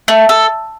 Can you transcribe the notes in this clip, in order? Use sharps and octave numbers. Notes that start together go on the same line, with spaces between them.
A3
A4